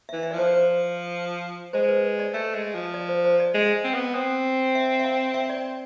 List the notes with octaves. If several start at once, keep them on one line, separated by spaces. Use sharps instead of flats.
E5
E3
E5
D5
F3 C5
C5
G#3 C5
B4
D5
A3 E5
G#3
F3
D5
C5
C5
D5
G#3
C4
B3
C4
E5
E5
F5
E5
D5